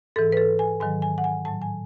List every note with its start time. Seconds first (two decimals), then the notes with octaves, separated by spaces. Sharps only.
0.16 G#2 E3 A4
0.32 B4
0.37 A4
0.59 G#5
0.80 G#2 D#3 F#3 G#5
1.02 G#5
1.18 F#5
1.24 G#5
1.45 A2 F#3 A5
1.62 G#5